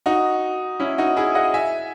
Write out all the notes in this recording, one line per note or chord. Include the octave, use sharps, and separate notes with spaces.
D#4 F#4
C#4 E4
D#4 F#4
E4 G#4
D#5 F#5
E5 G#5